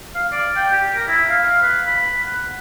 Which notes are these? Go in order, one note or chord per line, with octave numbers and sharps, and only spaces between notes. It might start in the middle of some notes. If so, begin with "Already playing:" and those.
F5
D5
G5
G4
A#4
E4
F5
B4
B5
F#5